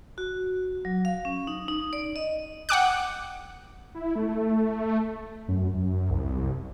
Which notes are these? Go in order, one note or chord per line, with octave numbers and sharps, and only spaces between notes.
F#4
F#3
F5
C#4
D#4
D#4
D5
D#5
F#5 G5 D6 F#6
E4
A3
F#2
F#2
C2